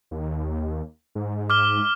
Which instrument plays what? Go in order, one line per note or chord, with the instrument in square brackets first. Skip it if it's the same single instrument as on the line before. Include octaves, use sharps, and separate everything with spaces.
[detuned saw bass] D#2
G#2
[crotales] D6 F6 G7